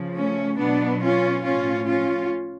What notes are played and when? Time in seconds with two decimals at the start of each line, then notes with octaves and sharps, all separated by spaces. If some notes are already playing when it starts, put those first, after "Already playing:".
Already playing: C#3 F3
0.16 A3 C#4
0.59 B2 F#3 B3 D4
1.02 C#4 F4
1.45 A2 F3 C#4 F4
1.87 C#4 F4